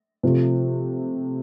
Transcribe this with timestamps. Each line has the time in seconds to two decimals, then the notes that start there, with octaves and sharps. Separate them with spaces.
0.23 C3 F3 A3